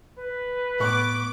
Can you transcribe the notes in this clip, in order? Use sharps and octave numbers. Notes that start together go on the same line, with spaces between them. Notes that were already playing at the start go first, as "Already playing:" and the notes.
B4
A2 B3 C#6 D6 F#6